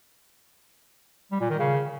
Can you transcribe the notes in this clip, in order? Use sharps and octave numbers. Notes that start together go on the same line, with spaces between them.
G3
A#2
D#3
C#3